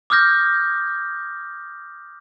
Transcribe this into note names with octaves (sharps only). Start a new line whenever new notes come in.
D6 D#6 F6 G6 A#6